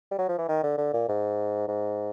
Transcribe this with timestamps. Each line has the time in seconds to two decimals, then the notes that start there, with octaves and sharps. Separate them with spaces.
0.11 G3
0.18 F#3
0.29 F3
0.38 E3
0.49 D#3
0.63 D3
0.78 D3
0.93 A#2
1.08 G#2
1.68 G#2